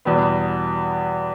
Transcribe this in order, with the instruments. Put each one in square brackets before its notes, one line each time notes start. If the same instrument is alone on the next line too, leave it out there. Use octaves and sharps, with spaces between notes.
[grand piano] E2 B2 G3 B3